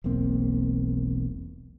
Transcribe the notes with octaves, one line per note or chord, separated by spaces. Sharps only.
E1 B1 A#3 C4